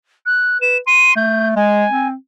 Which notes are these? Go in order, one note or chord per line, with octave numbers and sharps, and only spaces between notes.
F#6
B4 E7
C6 D#7
A3 G6
G#3 G#5
C4